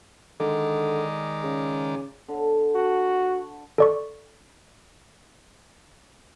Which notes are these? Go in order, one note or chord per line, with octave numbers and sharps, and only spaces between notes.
D3 D#3 G#3 D5
C#3
D3
F#4
A4 D5 C#6